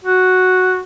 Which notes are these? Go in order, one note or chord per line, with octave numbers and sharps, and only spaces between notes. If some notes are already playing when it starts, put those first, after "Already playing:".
F#4